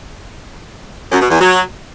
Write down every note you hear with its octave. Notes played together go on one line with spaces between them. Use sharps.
F#2
B2
E2
F#3